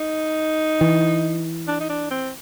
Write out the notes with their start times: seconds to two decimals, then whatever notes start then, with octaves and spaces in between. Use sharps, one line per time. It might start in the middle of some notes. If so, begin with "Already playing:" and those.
Already playing: D#4
0.81 E3
1.68 D4
1.80 D#4
1.89 D4
2.11 C4